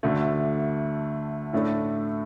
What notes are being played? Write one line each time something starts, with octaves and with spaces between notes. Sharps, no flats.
D2 D3 A3
A2 A3 D4 A4